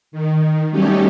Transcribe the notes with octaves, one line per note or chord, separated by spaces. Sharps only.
D#3
F#3 G3 A3 C#4 D#4 G4